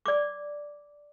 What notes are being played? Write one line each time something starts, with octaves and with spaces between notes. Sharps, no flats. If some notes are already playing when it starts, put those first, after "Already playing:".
D5 D6